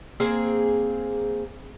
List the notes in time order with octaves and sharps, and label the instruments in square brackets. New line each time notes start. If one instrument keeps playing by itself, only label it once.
[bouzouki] A#3 C4 G#4